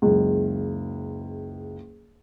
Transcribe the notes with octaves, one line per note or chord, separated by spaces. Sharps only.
F#1 C#2